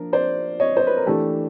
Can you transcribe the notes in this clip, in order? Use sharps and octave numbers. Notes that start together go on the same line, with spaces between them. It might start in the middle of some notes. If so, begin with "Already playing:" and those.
Already playing: F3 A#3 D4 A#4
C5 D5
C#5 D#5
C5
B4
A#4
E3 A3 D4 G4 A4